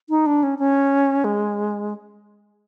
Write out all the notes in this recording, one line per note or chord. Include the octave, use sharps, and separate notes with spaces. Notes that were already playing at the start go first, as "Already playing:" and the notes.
D#4
D4
C#4
C#4
G#3